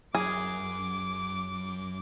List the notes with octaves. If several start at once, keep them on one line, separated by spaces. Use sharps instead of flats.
F#2 G#4 D6